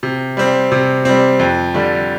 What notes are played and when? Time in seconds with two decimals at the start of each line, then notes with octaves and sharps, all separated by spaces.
0.03 C3
0.37 G3 C4
0.72 C3
1.05 G3 C4
1.39 F2
1.74 D3 G3